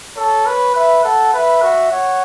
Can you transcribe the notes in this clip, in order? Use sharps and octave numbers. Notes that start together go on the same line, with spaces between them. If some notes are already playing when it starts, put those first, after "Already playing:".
A4 C#5
B4
B4 E5
A4 F#5
B4 E5
F#4
C#5 F#5